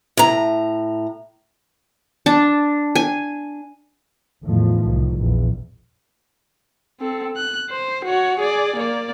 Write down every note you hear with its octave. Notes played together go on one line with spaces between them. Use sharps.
A2 A#5
D4 A5
G#5
E2 A2 D#3 F3 A3
C2 D#3
A#1 E2
C4 A4
F#6
C5
F#4 C#5
G#4 D5
A#3 D5